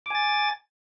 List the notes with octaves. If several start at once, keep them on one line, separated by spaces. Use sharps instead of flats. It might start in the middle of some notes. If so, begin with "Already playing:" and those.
G#5 D6 A6